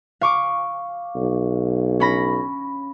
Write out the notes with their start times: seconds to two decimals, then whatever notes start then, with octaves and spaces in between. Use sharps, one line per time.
0.21 F5 C#6 D6
1.16 B1
2.00 C#4 B5 A#6